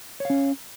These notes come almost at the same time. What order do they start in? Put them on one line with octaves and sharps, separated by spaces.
C#5 F5 C#4